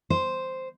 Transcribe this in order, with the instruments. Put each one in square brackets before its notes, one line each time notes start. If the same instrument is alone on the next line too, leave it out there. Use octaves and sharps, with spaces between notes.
[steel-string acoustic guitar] C5